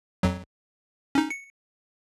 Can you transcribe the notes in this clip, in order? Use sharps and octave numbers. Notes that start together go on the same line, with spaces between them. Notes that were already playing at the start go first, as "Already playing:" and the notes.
F2 F#3
C#4 D#4
C#7